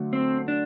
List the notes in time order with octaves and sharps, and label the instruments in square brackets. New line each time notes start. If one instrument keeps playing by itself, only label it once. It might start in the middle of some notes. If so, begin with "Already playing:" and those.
Already playing: [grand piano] D3 F#3 A3
[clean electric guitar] C4
D4